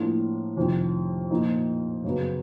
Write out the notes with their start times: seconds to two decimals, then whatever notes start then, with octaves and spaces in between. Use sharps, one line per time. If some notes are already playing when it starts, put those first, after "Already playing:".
Already playing: A2 F3 A#3 D4 F4
0.57 F2 C3 D#3
1.30 A#2 F3 A#3 D#4
2.04 F#2 C#3 F#3 B3